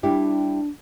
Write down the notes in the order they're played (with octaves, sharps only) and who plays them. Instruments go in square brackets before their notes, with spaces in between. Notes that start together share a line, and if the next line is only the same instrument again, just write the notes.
[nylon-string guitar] G3 E4 G4 [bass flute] D4